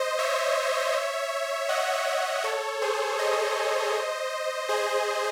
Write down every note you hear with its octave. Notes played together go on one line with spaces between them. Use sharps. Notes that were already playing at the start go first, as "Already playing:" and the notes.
Already playing: C5 D#5
C#5 E5
D#5 F#5
C#5 E5
A4 C#5
G#4 C5
C5 D#5
G#4 C5